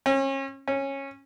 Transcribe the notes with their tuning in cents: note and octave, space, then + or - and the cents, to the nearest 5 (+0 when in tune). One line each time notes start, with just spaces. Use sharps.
C#4 -35
C#4 -15